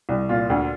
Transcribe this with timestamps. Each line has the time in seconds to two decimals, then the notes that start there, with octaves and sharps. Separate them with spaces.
0.09 C2
0.29 A#2 F4
0.50 D2